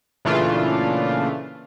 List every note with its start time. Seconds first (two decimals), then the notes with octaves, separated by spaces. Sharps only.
0.25 A#2 C#3 E3 A3 D4 F4